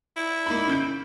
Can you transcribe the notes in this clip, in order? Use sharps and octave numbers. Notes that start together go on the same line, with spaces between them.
E4
A#3 D#4 B5
C#3 G6 D7